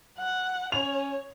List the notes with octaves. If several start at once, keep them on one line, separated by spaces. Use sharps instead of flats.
F#3 F#5
C#4 C#5 F7